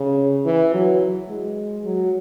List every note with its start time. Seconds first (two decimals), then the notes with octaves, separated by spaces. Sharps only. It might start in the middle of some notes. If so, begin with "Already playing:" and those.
Already playing: C#3
0.45 E3
0.73 F#3
1.29 G#3
1.85 F#3